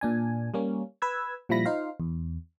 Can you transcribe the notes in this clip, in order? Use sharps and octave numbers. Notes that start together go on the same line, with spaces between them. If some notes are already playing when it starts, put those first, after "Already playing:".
A#2 D4 G#5
G3 A#3 C#4
B4 E6 G#6
A#2 F3 G3 E4 B5 A#6
D#4 F4 C5 F5
E2